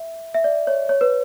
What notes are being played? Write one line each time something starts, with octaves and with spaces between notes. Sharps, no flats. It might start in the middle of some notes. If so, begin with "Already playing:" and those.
Already playing: E5
E5
D5
C#5
C#5
B4